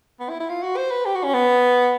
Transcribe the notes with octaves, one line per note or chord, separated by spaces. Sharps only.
B3
E4
E4
F4
F#4
C5
B4
G4
F#4
C#4
B3